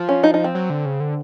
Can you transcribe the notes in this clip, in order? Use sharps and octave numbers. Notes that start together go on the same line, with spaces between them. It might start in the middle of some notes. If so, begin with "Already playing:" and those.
Already playing: F3
C#4
D#4
D#4
C4
F#3
D3
C#3
D3